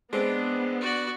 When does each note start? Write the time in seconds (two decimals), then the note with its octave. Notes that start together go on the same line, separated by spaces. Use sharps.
0.13 G#3 B3 C4 D4
0.81 F#4 D5